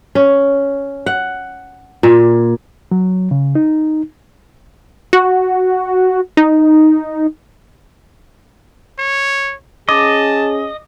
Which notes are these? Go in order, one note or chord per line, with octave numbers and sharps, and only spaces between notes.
C#4
F#5
A#2
F#3
C#3
D#4
F#4
D#4
C#5
C#4 G#4 D#5 A5 D6